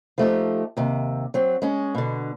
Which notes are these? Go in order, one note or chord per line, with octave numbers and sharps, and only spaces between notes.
F3 A3 D#4 G4
D#2 C3
F#3 C4
G#3 C#4
B2 D3